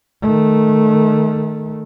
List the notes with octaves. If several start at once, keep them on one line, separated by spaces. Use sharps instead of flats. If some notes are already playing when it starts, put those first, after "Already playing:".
D#3 A3